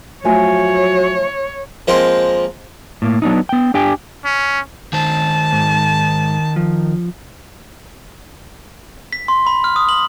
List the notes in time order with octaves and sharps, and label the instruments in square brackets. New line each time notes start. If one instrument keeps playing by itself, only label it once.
[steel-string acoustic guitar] F3 A3 G#5 [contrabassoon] F#3 [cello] C#5
[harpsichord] F3 G#3 A#3 C4 C5
[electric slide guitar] A2 A#3
F#3 B3 D4 D#4
B3 G5
D4 G4 G5 G#5
[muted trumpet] C#4
[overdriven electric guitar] D#3 C5 [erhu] A5
[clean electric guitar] G#2
F3
[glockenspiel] B6
C6
B5
F6
D#6
F#7